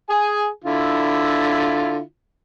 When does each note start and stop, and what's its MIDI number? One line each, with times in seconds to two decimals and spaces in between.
0.10 0.48 68
0.10 0.48 80
0.64 2.01 50
0.64 2.01 64
0.64 2.01 65